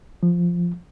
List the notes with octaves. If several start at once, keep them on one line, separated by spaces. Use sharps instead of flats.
F3